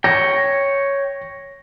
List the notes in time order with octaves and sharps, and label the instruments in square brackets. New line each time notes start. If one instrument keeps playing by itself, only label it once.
[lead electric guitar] C#5 G5 [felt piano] A#6